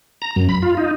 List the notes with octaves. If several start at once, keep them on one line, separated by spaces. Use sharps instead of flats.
A#5
F#2
B5
F4
D#4